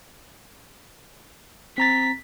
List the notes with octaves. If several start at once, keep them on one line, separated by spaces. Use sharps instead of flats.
C4 A#5 A6 B6